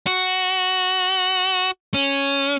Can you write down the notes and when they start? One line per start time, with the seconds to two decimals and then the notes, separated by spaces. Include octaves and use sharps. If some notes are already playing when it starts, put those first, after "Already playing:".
0.07 F#4
1.94 C#4